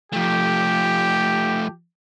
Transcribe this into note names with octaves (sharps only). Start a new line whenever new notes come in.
F3 A3 G4